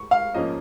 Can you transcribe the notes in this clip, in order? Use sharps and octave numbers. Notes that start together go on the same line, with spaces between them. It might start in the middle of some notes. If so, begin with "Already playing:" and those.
Already playing: C#6
F5
G#2 F3 A#3 C#4 D#5